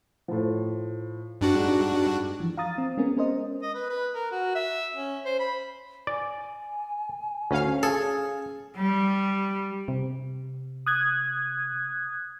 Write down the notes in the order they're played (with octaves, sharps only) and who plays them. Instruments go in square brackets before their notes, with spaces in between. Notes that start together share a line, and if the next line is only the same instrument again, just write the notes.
[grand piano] A2 F3
[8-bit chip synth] G2 D4 F#4
[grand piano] G#3 D#4
[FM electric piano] E3 F3
F5 A#5 D#6 A6
C4
G#3 B3 C#4 G#4 A#4
C#4 A#4 C5 D#5
[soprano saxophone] D#5
B4
B4
A#4
F#4
E5
C#4
C5
B5
[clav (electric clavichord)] D5 [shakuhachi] G#5
[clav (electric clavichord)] D2 [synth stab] C#4 F5
[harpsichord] G#4 [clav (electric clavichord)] A4
[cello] G3
[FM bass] C3
[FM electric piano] D#6 F#6 G#6